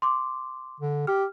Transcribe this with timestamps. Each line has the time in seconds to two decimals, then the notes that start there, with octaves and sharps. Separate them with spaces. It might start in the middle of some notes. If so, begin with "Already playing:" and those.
0.02 C6 D6
0.80 D3
1.07 G4 F6